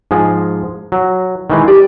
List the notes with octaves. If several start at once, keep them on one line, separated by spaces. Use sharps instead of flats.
G#2 F3 G#3
F#3
D#3 E3 G#3
G4 D5